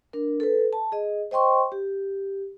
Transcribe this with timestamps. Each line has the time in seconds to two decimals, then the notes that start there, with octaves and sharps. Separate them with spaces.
0.13 D4 A#4
0.40 A4 B4
0.73 A5
0.92 G#4 D#5
1.31 C5 D#5 G5 C6 C#6
1.72 G4